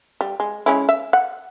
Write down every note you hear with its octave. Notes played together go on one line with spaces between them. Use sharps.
G3
G#3
G#3 C#4 E4
E5
F#5